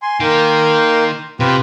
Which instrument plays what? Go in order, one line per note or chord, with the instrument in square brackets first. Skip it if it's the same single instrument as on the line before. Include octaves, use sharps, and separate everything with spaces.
[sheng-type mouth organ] G#5 C6
[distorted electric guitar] D#3 [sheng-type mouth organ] A#3 G5 C6
[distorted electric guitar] C3 [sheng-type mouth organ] F4 G4 B4